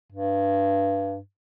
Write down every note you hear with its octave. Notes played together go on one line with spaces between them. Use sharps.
G2